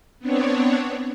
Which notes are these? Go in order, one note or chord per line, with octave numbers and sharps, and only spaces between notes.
B3 C4 D4 C#5